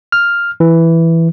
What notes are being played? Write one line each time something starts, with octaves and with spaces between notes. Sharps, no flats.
F6
E3